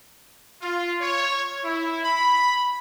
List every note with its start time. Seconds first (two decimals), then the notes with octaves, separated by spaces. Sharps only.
0.61 F4
1.01 C#5
1.63 E4
2.04 B5